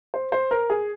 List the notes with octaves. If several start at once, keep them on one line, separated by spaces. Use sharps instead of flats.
C5
C5
A#4
G#4